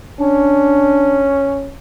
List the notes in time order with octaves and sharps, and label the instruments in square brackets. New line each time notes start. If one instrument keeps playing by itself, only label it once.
[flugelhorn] C#4 [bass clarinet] D4